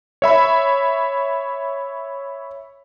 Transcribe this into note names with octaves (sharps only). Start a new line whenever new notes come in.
C#5 E5 B5